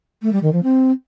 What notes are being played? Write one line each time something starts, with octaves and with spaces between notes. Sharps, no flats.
A3
G3
D#3
F3
C4